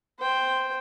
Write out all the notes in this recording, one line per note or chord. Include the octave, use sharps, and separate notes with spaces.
C5 G5